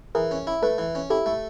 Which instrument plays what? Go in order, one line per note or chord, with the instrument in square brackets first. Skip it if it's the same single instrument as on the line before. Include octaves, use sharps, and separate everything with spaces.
[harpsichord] E3 [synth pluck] G#4 A#4
[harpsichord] C#4
E4
[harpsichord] A3 [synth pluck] A4 B4
[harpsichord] E3
C#4
[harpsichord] E4 [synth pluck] G4 A4
[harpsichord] A3